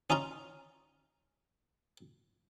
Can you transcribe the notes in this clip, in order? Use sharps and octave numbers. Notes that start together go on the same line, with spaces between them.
C#4 D#4 F4 A#5